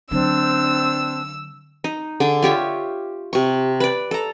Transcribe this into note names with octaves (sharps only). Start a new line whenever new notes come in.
D3 F#3 C4 D4 E6
D#4
D3 G#4 D6
F4 G4 C#5 E5
C3 C#6
B4 D5
A4 A#5